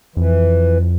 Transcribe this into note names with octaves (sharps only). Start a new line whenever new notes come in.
F2 E3